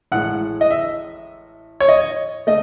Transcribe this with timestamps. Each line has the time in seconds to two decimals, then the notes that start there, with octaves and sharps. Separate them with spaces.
0.12 A1 A2 G#3 F#5
0.61 D#5
0.71 E5
1.80 C#5
1.88 D#5
2.47 A3 D#5